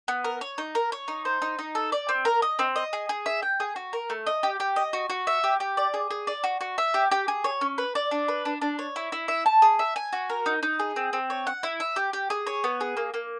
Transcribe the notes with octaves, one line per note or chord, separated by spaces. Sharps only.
B3
A#4
C#5
D#4
A#4
C#5
D#4
C5
D#4
D#4
A4
D5
C4
A#4
D#5
C4
D#5
G#4
G#4
E5
G5
G#4
F#4
A#4
A3
D#5
G4
G4
D#5
F#4
F#4
E5
G4
G4
D5
G#4
G#4
D5
F#4
F#4
E5
G4
G4
G#4
C#5
C#4
B4
D5
D4
B4
D4
D4
C#5
E4
E4
E5
A5
G#4
E5
G#5
F#4
A#4
D#4
D#4
G#4
C4
C4
C#5
F#5
E4
E5
G4
G4
G#4
C#5
B3
G#4
A#3
A#3